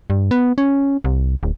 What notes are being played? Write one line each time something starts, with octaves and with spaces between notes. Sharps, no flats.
G2
B3
C#4
C2
D1